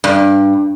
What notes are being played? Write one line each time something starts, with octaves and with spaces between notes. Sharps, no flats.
G2